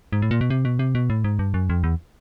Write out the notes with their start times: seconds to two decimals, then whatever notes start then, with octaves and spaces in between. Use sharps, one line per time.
0.12 G#2
0.22 A2
0.31 A#2
0.41 B2
0.50 C3
0.65 B2
0.79 C3
0.95 B2
1.10 A2
1.24 G#2
1.39 G2
1.54 F#2
1.70 F2
1.84 E2